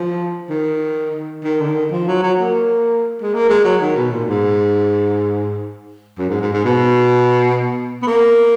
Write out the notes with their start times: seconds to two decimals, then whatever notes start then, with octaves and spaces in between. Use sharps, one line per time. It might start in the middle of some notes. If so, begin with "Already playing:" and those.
Already playing: F3
0.50 D#3
1.44 D#3
1.60 D3
1.68 D#3
1.92 F3
2.07 F#3
2.23 F#3
2.39 A#3
3.22 G#3
3.34 A#3
3.49 G#3
3.65 F#3
3.81 D#3
3.96 B2
4.12 A#2
4.29 G#2
6.18 F#2
6.30 G#2
6.41 G#2
6.53 G#2
6.65 B2
8.02 B3
8.07 A#3